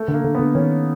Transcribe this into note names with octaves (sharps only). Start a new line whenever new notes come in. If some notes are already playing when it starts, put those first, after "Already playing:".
Already playing: A3
D3
A#3
D3
D3 B3
D#3 C#4